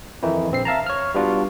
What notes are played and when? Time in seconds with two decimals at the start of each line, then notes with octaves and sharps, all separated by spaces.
0.23 F2 D#3 E3 D#4 E4
0.51 A#1 C4 C7
0.65 E5 F5 A5 A#5
0.86 C#5 F6
1.14 G3 B3 D4 F4 F#4